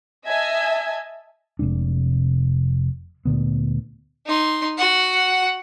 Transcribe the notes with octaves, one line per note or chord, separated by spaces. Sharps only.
D#5 E5 G#5 A5 G#6
F1 C3 G#3 D4
D2 A#2 D3 B3
D#4 C6
F#4 F#5